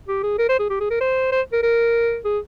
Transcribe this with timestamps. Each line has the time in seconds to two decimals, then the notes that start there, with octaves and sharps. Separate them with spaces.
0.08 G4
0.23 G#4
0.38 A#4
0.49 C5
0.59 G#4
0.70 G4
0.80 G#4
0.90 A#4
1.00 C5
1.32 C5
1.53 A#4
1.63 A#4
2.25 G#4